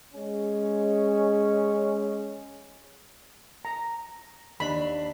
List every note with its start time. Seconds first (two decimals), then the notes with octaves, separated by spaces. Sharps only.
0.14 G#3 C#4
3.65 A#5
4.60 D#2 D4 B5